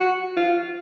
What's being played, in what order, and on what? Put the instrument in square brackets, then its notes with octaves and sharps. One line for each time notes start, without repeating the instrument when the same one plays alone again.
[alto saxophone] F#4
F4